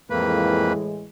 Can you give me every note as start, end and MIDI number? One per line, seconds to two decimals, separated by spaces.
0.10 0.73 41
0.10 1.09 45
0.10 1.09 52
0.10 1.09 56
0.10 0.73 58
0.10 0.73 71